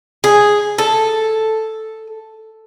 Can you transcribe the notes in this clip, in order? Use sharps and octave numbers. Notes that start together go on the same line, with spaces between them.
G#4
A4